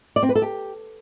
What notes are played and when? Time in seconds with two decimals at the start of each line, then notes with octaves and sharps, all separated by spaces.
0.16 D5
0.23 C4
0.29 B4
0.35 A4
0.42 G4